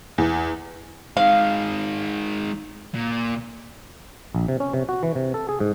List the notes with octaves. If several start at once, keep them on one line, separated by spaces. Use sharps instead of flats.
E2
D#3 G#3 F5
A#2
A#1
C3
C#4
C3
F#4
E3
C3
A4
G#4
G#2